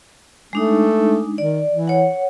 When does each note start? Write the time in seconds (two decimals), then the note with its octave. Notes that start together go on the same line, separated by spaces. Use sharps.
0.53 G#3 A3 D4 D#4
1.38 D#3 D5
1.70 E3
1.88 C#5 F#5